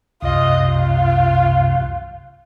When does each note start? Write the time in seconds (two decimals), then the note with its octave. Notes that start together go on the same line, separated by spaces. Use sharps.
0.22 C2 F#2 C3 F4 D#5
0.65 F4